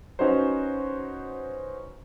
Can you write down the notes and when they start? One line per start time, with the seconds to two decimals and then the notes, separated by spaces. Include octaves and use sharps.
0.19 C#4 D#4 F#4 B4 C5